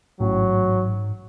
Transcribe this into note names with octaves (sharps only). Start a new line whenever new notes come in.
A1 G#2 F#3